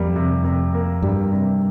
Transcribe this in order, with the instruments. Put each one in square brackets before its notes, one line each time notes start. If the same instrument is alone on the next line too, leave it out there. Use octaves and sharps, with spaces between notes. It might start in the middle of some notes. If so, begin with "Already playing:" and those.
Already playing: [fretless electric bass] F2 [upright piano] G3 A#3
[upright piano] C3
C3
A#3
[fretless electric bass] G2 [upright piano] G3
[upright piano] C3